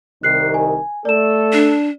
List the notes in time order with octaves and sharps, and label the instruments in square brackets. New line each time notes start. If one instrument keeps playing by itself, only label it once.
[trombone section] C2 D#3 [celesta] F#6 C7
[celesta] G#5
[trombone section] A3 A4 [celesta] D5 E7
[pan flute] D4